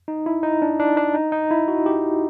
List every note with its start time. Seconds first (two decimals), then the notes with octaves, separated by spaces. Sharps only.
0.08 D#4
0.26 E4
0.43 D#4
0.62 D4
0.80 D4
0.97 D4
1.14 D#4
1.32 D#4
1.51 E4
1.68 F#4
1.86 G4